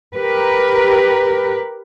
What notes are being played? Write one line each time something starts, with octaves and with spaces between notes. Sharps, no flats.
G4 A#4 B4